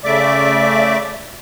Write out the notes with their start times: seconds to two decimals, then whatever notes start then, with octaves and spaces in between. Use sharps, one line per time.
0.04 C#3 A3 D5 E5 D6